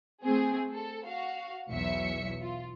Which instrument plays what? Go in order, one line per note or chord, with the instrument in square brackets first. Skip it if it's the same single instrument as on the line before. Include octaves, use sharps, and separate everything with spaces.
[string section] A3 C4 G#4
A4
F#4 F5
B1 E2 F#3 E5 C#7
F4